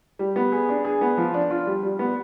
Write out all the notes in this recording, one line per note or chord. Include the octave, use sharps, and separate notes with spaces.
G3
B3
G#4
D4
G#4
B3
F3
D4
F4
G3
G3
B3